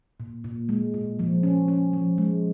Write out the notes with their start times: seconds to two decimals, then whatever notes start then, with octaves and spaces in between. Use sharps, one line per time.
0.20 A#2
0.44 A#2
0.69 G#3
0.94 A#2
1.19 F3
1.43 C#4
1.68 C#4
1.93 F3
2.18 G#3